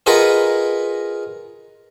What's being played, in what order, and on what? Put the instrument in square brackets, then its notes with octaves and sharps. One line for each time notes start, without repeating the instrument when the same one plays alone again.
[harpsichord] F4 G#4 A#4 B4 D#5 F#5